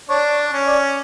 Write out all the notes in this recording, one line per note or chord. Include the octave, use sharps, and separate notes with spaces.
D4 C#5
D5
C#4
D5